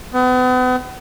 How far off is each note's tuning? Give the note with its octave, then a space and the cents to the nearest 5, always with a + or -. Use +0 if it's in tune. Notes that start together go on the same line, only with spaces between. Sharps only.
B3 +40